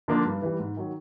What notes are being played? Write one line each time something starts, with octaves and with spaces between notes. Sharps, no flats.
D3 F3 A#3 D4
G2
E3 G3
G#2
D#3 F#3